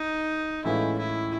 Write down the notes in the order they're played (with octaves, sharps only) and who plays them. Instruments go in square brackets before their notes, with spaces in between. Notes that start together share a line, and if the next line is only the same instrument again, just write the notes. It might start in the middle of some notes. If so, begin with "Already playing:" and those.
Already playing: [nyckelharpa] D#4
[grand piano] A2 E3 G#3 C#4 F4 [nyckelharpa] E4
[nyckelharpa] E4